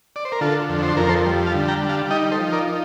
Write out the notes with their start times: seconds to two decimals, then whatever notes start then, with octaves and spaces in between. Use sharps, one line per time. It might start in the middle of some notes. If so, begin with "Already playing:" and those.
0.16 D5
0.25 C5
0.32 A#4
0.41 D3 F4 A4
0.69 F2
0.83 C5
0.97 F2 A#4
1.09 A4 C5
1.26 G3
1.46 F5 A5
1.54 D3
1.68 G5 A#5
1.82 G3
1.89 F5 A5
2.10 D#4 D#5 G5
2.31 A4 C5
2.39 F3
2.52 A#4 D5
2.67 D#4